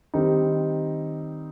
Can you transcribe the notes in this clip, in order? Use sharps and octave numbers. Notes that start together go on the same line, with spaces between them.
D#3 G3 C4 D#4